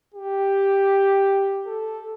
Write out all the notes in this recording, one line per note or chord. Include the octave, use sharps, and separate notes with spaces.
G4
A4